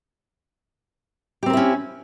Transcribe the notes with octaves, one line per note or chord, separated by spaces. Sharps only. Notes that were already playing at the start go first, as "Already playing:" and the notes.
C4 C#4 E4 G4 A#4